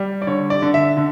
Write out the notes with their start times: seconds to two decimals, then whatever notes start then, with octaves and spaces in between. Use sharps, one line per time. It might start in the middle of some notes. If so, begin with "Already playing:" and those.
Already playing: G3
0.22 D5
0.27 D3 C#5
0.50 D5
0.62 D3
0.74 E5
0.97 D3